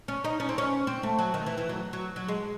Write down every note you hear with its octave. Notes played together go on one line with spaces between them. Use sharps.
C#4
D#4
C#4
C4
C#4
C4
A3
F#3
D#3
E3
E3
F#3
F#3
F#3
G#3